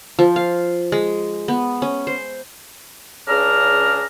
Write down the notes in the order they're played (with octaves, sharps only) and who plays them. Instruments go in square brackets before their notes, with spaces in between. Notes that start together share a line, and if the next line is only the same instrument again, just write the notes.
[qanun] F3
F5
G#3
B3
C#4
C5
[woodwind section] C#2 C#3 D4 G#4 A#5 F6